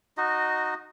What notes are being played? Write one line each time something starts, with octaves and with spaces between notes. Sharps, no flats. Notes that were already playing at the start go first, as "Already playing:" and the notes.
D#4 F#4 D#5